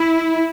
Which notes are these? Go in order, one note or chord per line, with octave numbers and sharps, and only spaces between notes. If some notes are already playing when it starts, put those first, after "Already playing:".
Already playing: E4